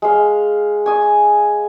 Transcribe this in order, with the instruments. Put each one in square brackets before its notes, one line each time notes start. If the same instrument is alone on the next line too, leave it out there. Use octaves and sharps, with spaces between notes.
[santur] G#3 F5
G#5 D#6